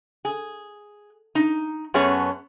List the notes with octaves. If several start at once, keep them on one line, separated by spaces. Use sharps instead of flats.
G#4
D#4
F#2 B3 C#4 G#4 C#5 A5